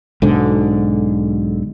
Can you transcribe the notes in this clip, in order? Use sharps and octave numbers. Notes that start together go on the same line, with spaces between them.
B1 G#2 D3